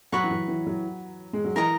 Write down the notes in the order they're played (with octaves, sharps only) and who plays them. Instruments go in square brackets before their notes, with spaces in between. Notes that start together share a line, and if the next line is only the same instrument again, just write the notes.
[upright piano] F#3 [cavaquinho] B4 F#5 A#5 C#6
[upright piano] E3
F#3
E3
F#3
G#3
F#3
[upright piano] E3 [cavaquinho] A#4 D#5 A#5